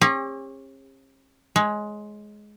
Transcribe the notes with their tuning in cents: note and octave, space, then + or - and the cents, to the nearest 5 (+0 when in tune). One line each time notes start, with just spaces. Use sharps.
C#4 -45 G4 +45 C#5 +45
G#3 +15 C#5 +0